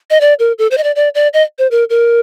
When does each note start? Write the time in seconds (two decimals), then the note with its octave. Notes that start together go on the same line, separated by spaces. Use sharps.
0.10 D#5
0.21 D5
0.39 A#4
0.58 A4
0.71 C5
0.78 D#5
0.84 D5
0.96 D5
1.15 D5
1.33 D#5
1.59 C5
1.71 A#4
1.90 A#4